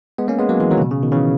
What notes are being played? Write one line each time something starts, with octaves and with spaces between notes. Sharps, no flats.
G#3 B3
A#3 C#4
G#3 B3
F#3 A#3
E3 G#3
D#3 F#3
C#3
B2
C#3
B2 D#3
C#3 E3